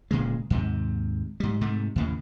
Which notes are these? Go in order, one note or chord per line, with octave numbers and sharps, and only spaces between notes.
D1 A#2 C#3 G#3
D#2 G#2 C3
G#2 G3
G#2 C3 A3
D#2 A2 C#3